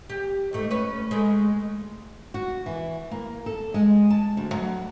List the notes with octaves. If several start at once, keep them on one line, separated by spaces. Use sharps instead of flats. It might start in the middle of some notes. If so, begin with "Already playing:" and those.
G4
G#2 A3
C#4 B4
G#3 A3
F#4
E3
A#3
A4
G#3
A5
D2
F#3